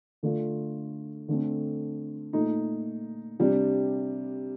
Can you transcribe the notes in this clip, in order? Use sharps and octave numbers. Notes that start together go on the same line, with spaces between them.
D3 A3 D4 F4
D3 A3 C4
A#2 A3 D#4
C3 G3 D4